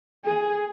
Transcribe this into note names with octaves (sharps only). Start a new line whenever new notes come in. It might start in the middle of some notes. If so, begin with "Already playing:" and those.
G#4